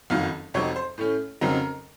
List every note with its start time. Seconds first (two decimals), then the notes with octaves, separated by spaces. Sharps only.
0.10 F#1 F2 D#3 F#3 F5
0.54 F2 C3 F#3 C4 D#4 C#5
0.76 C5
0.98 A2 A3 C#4
1.41 F2 C#3 F#3 C4 D#4 A#4